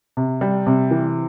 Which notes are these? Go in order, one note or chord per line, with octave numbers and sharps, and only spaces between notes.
C3
G3
C3
E3